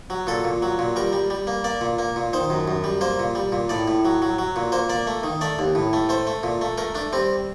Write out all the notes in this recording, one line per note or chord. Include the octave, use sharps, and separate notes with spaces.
F#3
A#2 A4
A#2
F#3
A#2
G3 A#4
G3
G3
A#3
A#3 D5
A#2
A#3
A#2
D#3 C5
F#2
F#2
G3
A#3 C5
A#2
G3
A#2
A2 D5
A2
F#3
F#3
F#3
A#2
A#3 C5
A#3 D5
A3
D#3
A3 D5
D#2
A2
A3
A3 C5
A3
A#2
A3
A3 A#4
A3 D4
G3 C4